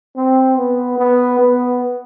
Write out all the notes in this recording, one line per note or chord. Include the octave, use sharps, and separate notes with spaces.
C4
B3
B3
B3